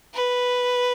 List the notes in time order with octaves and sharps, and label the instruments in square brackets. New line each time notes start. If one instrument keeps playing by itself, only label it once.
[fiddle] B4